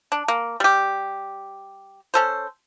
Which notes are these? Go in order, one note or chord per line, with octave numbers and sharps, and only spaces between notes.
D4
A#3
G3 G4
C#4 A4 C5